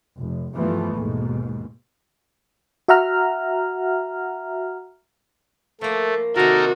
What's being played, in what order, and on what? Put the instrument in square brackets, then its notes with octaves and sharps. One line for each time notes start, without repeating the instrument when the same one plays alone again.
[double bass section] F1
G2 E3 F3 A3 B3
D#2 G#2 B2
[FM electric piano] F#4 E5 F#5 A#5 F6
[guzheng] F3 A#3 [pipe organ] A3
[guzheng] C3 D#3 [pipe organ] D#4 A4 A#4 [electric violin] F#4